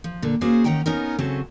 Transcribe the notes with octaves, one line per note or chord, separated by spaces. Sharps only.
F3
A#2 D3
A#3 C#4 F#4 G#4 C5 F5
D#2 D#3 C#4 F#5 G5 A#5
B3 C#4 D#4 A#4
C#3 F#3 C4 C#4 E4 A4